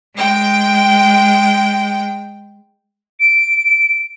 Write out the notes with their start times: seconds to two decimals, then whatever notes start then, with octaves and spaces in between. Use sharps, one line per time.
0.16 G#3 G5
3.20 D7